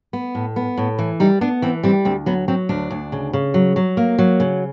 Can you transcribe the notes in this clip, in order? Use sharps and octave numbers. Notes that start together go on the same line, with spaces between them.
B3
A2
B3
A2
E3
G3 D#4
B3 D4
E3 C4
G3 C4
D2 C4
F#3 B3
F#3 C4
D2 D4
D2
C#3
C#3
F#3
F#3
A#3
F#3
C#3